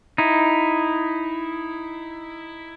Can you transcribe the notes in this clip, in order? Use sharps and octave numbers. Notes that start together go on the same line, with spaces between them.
D#4 E4